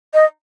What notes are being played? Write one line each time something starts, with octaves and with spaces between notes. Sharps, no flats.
D#5